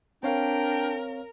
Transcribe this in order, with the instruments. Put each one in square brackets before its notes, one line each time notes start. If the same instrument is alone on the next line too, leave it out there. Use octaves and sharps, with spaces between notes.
[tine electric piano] C4 C#5 F5 [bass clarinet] D4 [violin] A#4 [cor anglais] G5